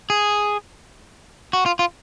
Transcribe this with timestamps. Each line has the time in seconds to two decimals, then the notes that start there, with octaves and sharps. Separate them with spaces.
0.10 G#4
1.53 F#4
1.66 F4
1.79 F4